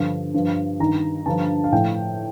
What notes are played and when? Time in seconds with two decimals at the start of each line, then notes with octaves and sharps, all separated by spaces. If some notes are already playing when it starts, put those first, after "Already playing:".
Already playing: G2 D3 F3
0.34 G2 F3
0.79 G2 D#3 A#5
1.26 G2 D3 F3 A5
1.64 F5
1.72 A2 F3 G5